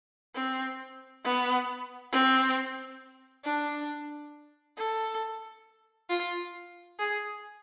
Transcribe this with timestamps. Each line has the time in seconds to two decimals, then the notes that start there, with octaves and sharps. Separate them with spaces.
0.35 C4
1.24 B3
2.12 C4
3.45 D4
4.77 A4
6.10 F4
6.99 G#4